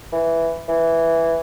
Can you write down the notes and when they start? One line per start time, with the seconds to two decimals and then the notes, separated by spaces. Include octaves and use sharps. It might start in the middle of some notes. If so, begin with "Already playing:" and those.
0.12 E3
0.68 E3